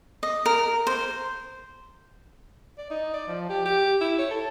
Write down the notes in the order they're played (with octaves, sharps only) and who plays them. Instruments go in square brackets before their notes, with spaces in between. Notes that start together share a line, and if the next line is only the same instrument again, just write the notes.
[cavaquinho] D#5
A#4
C5
[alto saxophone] D5
D#4
D5
F3
G4
G4
E4
C#5
A4